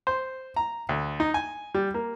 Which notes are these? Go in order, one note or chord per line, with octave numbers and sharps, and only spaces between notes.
C5
A#5
D2
D#4
G#5
G3
A#3